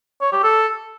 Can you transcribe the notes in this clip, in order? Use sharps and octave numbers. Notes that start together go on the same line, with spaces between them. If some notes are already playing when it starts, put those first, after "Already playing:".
C#5
G4
A4